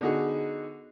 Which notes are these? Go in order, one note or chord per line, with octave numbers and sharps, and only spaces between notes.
D3 B3 D#4 F#4 G#4